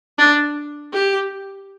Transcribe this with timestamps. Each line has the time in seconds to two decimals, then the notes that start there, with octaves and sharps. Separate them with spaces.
0.18 D4
0.93 G4